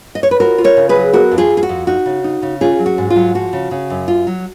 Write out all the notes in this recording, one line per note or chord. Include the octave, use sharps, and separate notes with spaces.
D#5
C#5
B4
F4 F#4 A#4
F4
A#4 C#5
C#3
G#4 B4
F#3
B3 F#4 A#4
F2
F4 G#4
F2
G#4
F#4
F2
D#4 F#4
C#3
D#4
C#3
C#4 F4 G#4
F#3
F#4
G#2
F4
F#3
F3 F#4
C#3
C#3
F#2
F4
F#3